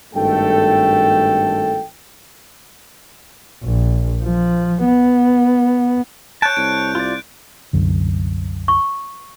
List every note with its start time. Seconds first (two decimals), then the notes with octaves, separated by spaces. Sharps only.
0.14 G#1 G2 A3 A4 G5
3.63 A#1
4.24 F3
4.85 B3
6.42 C#5 A5 F#6 G6 D7
6.57 C2 D7
6.95 F4 D5
7.73 C2 F#2 D3
8.68 C#6